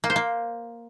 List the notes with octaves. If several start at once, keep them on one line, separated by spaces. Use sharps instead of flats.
A#3
C5
A#3